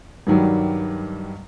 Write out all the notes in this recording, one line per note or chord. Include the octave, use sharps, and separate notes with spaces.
G2 D#3 F#3 G3